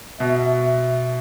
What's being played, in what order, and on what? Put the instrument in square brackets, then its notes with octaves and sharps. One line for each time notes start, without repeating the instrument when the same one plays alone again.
[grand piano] B2 [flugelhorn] E5